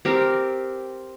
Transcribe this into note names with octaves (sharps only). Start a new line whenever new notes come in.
C4 G4 A#4